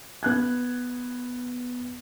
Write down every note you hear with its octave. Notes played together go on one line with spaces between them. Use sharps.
B3 F#6 G#6